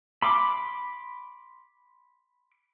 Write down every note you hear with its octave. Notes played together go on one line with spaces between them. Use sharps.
B5 C6 D6